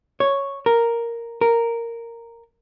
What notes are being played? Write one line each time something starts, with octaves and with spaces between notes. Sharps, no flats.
C#5
A#4
A#4